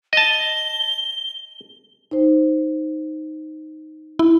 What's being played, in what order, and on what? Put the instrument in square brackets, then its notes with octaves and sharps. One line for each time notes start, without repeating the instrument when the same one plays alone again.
[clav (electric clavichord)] D#5 A5 [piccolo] G7
[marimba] D#4 C5
[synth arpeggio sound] E4